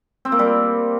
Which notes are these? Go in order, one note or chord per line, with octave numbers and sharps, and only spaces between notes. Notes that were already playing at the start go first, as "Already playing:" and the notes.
C4
A#3
G3